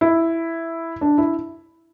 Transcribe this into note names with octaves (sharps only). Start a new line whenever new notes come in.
E4
D4
E4